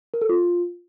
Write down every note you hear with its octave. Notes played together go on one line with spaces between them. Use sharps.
A#4
A4
F4